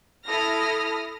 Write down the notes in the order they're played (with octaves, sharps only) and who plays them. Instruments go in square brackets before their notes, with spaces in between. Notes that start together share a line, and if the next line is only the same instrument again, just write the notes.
[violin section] E4 A4 D#6 F6 A#6